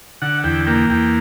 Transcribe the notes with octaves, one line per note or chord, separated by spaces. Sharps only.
D3 F#5
E2 G5
A#3 G5
E2 G5